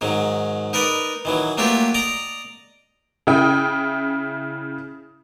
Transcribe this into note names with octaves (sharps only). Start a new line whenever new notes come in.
G#2 D#3 F#3
D#4 A#4 B4 D5 D#5
D#3 E3 F#3
F#3 A3 A#3 D4 F4 G4
D5 D#5 A#5 D6
C#3 E4 G5 D#6